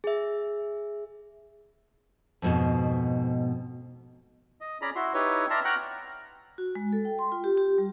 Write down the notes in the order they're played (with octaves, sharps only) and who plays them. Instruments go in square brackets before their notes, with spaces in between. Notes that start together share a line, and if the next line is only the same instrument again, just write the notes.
[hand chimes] G#4 E5
[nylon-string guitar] F2 G#2 B2
[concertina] D#5
C#4 G#4 D5 A#5 B5
E4 F#4 C6
D#4 E4 G4 B4 C#5
D5 E5 A5 A#5 C6 F6
F#5 G5 A#5 C#6 F6 F#6
[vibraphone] F#4
G#3
A4
G5
C6
F4
G4
G4
G3